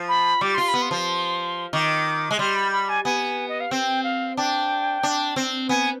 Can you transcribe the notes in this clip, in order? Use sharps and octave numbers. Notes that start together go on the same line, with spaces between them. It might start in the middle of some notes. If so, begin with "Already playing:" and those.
Already playing: F3
B5
G3 D6
F4 C6
B5
B3
C6
F3
D#3 D6
G#3
G3 C6
B5
B5
G#5
B3 G#5
D#5
F5
C4 G5
F5
D4 G5
D4
C4
B3 G#5